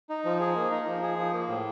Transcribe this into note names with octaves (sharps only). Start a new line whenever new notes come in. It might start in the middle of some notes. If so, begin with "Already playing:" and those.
D#4
F3
G#4
A#3
D#4
F3
G#4
F3
A#3
A2